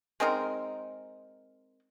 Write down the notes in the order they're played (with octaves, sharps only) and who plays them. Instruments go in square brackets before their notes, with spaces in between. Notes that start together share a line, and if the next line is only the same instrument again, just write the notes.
[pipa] G#3 C4 D#4 A#4